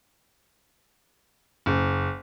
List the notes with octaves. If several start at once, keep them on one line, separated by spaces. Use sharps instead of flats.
F#1